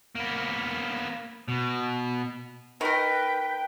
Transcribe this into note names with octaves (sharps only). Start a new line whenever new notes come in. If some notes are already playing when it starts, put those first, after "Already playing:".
A#3 B3
B2
D#3 A#4 B4 G5